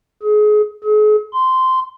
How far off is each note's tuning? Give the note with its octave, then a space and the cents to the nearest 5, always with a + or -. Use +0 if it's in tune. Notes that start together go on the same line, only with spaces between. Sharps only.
G#4 +30
G#4 +40
C6 -10